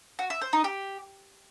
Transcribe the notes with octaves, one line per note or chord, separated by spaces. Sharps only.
F#4
E5
C5
D#4
G4